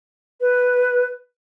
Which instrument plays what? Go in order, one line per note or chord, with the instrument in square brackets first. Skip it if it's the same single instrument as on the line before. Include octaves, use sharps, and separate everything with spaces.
[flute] B4